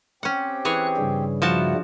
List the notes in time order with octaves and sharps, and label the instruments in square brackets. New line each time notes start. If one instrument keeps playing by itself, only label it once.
[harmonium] C4 G4 [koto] C#4 F#5
[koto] E3 G#4 C#5 [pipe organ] F#6
[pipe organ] G2 C#3 G3
[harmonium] B2 E4 F#5 [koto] F3 F#4 A5